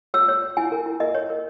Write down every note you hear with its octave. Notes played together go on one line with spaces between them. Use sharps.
C#5 E6
C#5
C#5
E4 G#5
A#4
E4
A#4 D#5
C#5
A#4